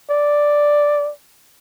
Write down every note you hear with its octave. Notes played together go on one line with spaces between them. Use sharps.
D5